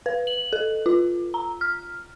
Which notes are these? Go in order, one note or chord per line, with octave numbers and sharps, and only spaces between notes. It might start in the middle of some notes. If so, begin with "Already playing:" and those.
B4
F#7
A4
F4
A#5
F6